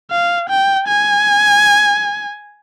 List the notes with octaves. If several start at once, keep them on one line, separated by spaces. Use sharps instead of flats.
F5
G5
G#5